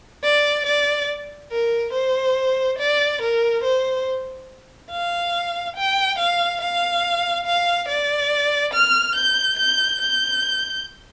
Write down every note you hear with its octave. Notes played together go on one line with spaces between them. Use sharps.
D5
D5
A#4
C5
D5
A#4
C5
F5
G5
F5
F5
F5
D5
F6
G6
G6
G6